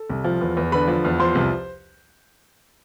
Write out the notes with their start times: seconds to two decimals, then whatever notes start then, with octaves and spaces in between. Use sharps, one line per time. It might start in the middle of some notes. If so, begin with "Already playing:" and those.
Already playing: A4
0.10 C2
0.24 F3
0.41 E2
0.57 E2
0.72 D3 B4 B5
0.88 F3
1.04 E2
1.19 F3 C5 C6
1.35 C2